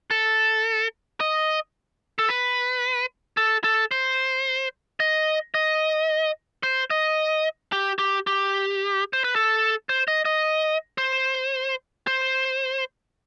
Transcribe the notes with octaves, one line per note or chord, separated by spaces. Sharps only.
A4
D#5
A4
B4
A4
A4
C5
D#5
D#5
C5
D#5
G4
G4
G4
C5
B4
A4
C5
D#5
D#5
C5
C5